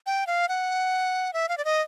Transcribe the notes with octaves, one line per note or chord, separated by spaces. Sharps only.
G5
F5
F#5
E5
F5
D5
D#5